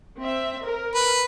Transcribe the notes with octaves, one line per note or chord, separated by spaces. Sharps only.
C4 E5
A#4
B4